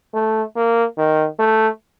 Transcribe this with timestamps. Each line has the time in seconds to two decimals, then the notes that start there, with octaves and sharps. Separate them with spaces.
0.14 A3
0.56 A#3
0.97 D#3
1.39 A3